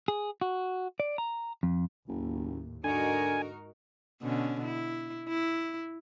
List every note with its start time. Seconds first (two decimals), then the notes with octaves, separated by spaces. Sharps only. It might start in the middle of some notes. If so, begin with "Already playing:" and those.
0.08 G#4
0.41 F#4
1.00 D5
1.18 A#5
1.63 F2
2.08 F#1 D#2 A2
2.84 G#2 D3 D#4 F#4 A#4 G#5
4.22 B2 D3 C#4
4.64 E4
5.29 E4